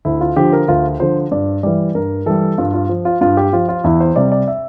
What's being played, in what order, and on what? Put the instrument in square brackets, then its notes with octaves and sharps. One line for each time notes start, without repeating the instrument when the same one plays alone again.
[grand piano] D2 E4
F4
D3 F3 G4
A#4
D2 F4
D3 F3 C5
G2 D5
E3 G3 D5
G2 A#4
E3 G3 A4
G2 F4
F4
F3
F4
G2 F4
G4
F3 F4
F4
E2 E4
C5
C3 G3 D5
D5
E5